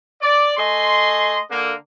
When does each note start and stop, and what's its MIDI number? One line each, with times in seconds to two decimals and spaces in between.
0.22 0.57 74
0.58 1.39 57
0.58 1.39 75
0.58 1.39 80
0.58 1.39 84
1.51 1.74 50
1.51 1.74 58